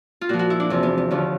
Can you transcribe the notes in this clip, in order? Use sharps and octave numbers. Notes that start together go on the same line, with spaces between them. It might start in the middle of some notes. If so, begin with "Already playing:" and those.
F4
A#2 F3 F#4
F#4
E4
D4
E2 C3 F3
B3
B3
D#2 D3 F3 C#4